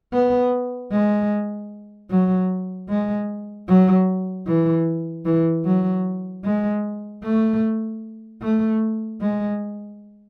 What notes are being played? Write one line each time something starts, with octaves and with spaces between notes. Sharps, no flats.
B3
G#3
F#3
G#3
F#3
E3
E3
F#3
G#3
A3
A3
G#3